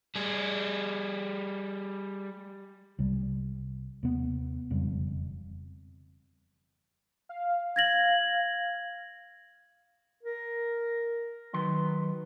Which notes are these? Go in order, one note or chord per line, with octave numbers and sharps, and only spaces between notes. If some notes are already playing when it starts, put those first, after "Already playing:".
G3 G#4
C2 C3 G3
D#2 C3 B3
E1 F2 C#3 G3
F5
G#6 A#6 F#7
A#4
D#3 F#3 B4 C6